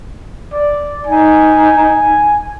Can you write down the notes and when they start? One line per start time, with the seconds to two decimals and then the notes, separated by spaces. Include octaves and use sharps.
0.53 D5
1.07 D#4 G#5